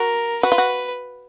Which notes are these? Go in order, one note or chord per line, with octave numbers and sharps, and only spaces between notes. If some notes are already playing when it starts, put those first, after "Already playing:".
Already playing: F#4 A#4
F#4 B4
F4
F#4